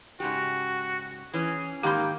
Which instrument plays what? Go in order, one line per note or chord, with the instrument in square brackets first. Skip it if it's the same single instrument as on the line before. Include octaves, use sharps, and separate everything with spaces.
[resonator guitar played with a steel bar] G#2 C#3 G4 [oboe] F#4
[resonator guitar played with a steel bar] E3 C#4 [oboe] G#4
[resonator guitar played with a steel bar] G#2 D#3 [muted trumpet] A#3 [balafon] G4 B5 [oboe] G5